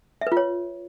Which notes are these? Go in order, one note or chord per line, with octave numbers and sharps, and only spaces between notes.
E5
B4
F4
C#5